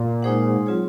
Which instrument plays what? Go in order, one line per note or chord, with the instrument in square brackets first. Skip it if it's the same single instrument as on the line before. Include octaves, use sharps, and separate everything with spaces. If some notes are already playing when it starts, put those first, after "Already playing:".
Already playing: [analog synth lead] A#2
[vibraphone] G#3 D#4 G#4 C5 F#5
F#3 C4 F4 G#4 C#5